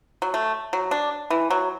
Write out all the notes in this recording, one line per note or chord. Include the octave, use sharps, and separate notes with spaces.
F#3
A3
F#3
D4
E3
F#3